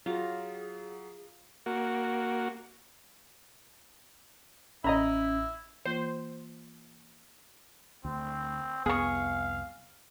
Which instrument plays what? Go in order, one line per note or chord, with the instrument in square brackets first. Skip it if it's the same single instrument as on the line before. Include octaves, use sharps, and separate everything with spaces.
[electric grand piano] F#3 [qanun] F4 A#5 [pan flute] G#4
[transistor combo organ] A#3 F#4
[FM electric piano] A1 [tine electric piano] C#4 [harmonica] E4 [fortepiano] D#5 A#5 B5
[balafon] E3 A#3 F4 [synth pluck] C5
[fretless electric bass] D2 [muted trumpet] C4
[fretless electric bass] C2 F2 B3 [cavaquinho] G#4 C#6 [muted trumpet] F5